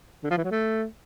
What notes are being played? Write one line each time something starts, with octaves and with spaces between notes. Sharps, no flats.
D3
F3
E3
F#3
A3